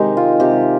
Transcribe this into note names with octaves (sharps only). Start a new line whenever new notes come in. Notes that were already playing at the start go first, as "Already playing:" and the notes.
Already playing: C3 D#3 G#3 D#4 G4
F4
C3 G4